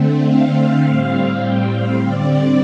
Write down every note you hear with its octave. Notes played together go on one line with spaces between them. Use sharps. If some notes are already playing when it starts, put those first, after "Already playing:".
Already playing: D3 A3 C4
F5
F5
A2 G3 C4 F5
G5
F5
D3 G3 C4 D5